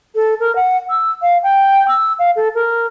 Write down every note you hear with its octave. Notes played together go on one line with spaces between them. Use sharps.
A4
A#4
F#5
E6
F5
G5
E6
F5
A4
A#4